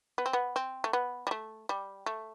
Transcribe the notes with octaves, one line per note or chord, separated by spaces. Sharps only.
B3
C4
B3
C4
A3
B3
G3
A3
G3
A3